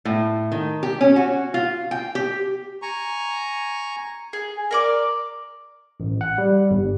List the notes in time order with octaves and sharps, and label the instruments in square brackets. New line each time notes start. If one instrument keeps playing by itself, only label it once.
[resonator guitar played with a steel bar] A2
D#3
G4
C#4
F#4
F4
G5
G4
[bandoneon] G#5 A#5 C#6
[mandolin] G#4
A#4 D5 D6
[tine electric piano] A1
F#5
G3
G1